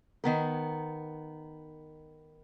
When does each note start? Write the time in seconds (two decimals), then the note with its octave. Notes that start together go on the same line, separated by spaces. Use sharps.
0.24 D#3 B3 A#4